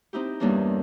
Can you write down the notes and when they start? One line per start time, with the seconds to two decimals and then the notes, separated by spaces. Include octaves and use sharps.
0.13 C4 D#4 E4 G4
0.40 E2 G2 G3 A#3 C#4 D4